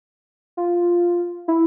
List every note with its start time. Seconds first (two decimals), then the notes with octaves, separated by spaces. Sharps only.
0.57 F4
1.48 E4